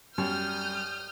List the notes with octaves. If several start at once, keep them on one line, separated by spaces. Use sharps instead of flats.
F#2 G3 D#6 F6 G6